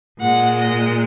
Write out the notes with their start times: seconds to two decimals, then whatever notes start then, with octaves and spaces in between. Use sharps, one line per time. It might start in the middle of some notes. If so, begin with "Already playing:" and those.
0.20 A#2 G#3 F#5
0.59 D#5